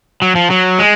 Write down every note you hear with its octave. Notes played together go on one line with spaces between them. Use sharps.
F#3
F3
F#3
G#3